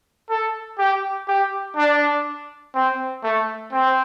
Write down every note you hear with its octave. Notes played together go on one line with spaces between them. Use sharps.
A4
G4
G4
D4
C4
A3
C4